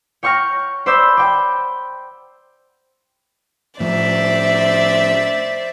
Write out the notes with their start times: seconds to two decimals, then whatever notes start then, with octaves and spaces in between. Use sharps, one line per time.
0.23 C#5 G5 C#6 F6 A#6
0.86 C5 D5 B5 E6 G6
1.17 D5 G5 G6
3.80 A2 F3 C5 D5 E5